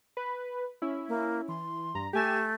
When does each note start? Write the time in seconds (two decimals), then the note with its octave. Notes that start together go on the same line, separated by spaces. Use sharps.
0.17 B4
0.82 C#4 E4
1.09 A#3
1.48 E3 C6
1.95 G2 A#5
2.13 A3 G4 G#5 E7